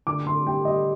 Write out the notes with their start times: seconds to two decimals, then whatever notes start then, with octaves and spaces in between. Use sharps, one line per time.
0.07 D3 D6
0.26 D3 C6
0.46 G3 G5
0.65 G3 D#5